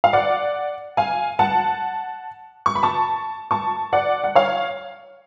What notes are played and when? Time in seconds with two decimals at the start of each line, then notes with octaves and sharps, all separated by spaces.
0.04 F5
0.13 D5 F#5
0.97 F5 G#5
1.39 F#5 A5
2.66 C#6
2.75 B5
2.83 A5 C#6
3.51 A5 C#6
3.93 D5 F#5
4.24 F#5
4.35 C#5 F5